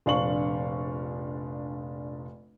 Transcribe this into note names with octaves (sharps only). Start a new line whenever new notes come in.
F1 A#1 D4 F5 C#6 F#7